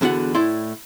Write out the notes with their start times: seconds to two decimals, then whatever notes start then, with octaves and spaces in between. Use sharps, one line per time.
0.01 E2 D3 B3 F#4 F#5
0.35 A2 E4 D5 C6